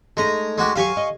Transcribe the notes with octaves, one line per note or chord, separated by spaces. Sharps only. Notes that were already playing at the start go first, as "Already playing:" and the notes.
G#3 A3 D#4 A#5
G#3 F#4 G4
F#3 G4 F5 G#5 C#6
D#5